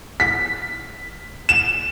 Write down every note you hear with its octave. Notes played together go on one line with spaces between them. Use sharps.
B6
E7